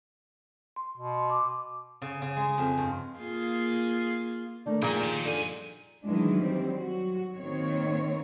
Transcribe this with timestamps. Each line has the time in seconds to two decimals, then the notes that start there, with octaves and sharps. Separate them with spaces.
0.76 C6
0.97 B2
1.30 D6
2.02 C#3
2.22 C#3
2.36 G#3
2.58 F2
2.78 G2
3.18 A#3 F4 G#4
4.66 D#3 A3 A#3 D4
4.82 A#2 F3 G3 D#4 G#4 D#5 G5
5.04 D#3
5.24 F#2 D3 G#5
6.05 D#3 E3 F#3 G#3 D4
6.40 F#3 G3 C4
6.79 F#3 F#4
7.36 D#3 A#3 C4 C#5